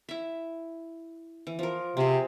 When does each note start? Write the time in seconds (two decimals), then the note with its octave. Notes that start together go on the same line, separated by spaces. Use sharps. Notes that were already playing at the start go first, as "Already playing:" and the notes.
0.09 E4 E5
1.47 E3
1.59 F3 A#4
1.97 C3 C4 G#4